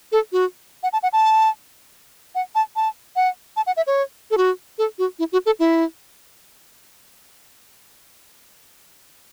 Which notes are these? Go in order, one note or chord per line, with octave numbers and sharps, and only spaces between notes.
A4
F#4
F#5
A5
F#5
A5
F#5
A5
A5
F#5
A5
F#5
E5
C#5
A4
F#4
A4
F#4
E4
F#4
A4
E4